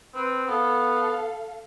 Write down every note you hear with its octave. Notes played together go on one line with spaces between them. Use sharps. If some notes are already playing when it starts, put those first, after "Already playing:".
C4 B4
B3 A4 F5